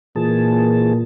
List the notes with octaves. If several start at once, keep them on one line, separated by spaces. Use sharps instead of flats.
A#2 E3 G#4 A5